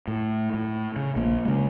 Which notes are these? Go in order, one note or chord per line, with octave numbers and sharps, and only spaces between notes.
A2
A2
C#3
A#1 A#3
C#3 G#3